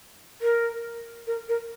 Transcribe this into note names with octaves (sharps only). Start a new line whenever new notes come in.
A#4
A#4
A#4